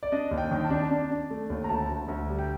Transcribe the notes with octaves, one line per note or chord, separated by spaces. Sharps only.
D5
D4 D#5
D#2
G5
D#3
A5
D4
D4
D4
A3
D#2
A#5
D2 A5
D2
D2
G3
G5